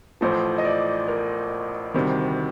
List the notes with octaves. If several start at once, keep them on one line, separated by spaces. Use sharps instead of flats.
A1 A2 F3 C5
D#5
D5
A#4
D2 C3 D#3 G3